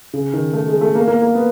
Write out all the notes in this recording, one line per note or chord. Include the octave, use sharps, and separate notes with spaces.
C#3
D#3
A3
G#3
A3
A#3
A#3
A#3
B3